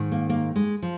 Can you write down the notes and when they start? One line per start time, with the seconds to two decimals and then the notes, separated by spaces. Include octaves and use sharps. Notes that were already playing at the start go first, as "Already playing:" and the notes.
Already playing: G#2 D#3
0.12 A#3
0.30 A#3
0.56 G#3
0.82 F3